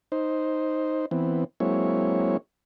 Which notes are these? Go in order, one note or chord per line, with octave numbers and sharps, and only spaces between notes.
D#4 C5
E3 B3 C4
F#3 G#3 A#3 C4 E4 C#5